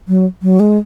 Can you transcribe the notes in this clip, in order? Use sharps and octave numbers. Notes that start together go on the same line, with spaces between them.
F#3
F#3
G#3